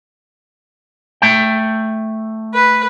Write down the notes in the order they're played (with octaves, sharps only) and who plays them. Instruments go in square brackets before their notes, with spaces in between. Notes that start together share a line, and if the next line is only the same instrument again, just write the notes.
[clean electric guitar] A3 G5
[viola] B4